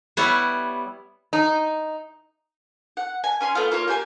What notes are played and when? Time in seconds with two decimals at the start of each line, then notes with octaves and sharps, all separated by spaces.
0.17 G3 B3 E4 C#5
1.33 D#4
2.97 F#5
3.24 G#5
3.41 C#4 G#5 C6
3.55 A3 B3 F4
3.71 A#3 F4 C#5
3.87 A#3 G4 G5 G#5